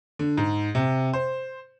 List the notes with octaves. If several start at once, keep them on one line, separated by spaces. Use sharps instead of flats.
D3
G#2
C3
C5